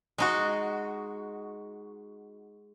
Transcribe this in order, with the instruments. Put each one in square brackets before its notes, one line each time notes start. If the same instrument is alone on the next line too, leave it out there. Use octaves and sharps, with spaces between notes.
[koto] G#3 D#4 F#4